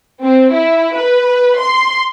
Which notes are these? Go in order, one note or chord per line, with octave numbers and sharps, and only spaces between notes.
C4
E4
B4
C6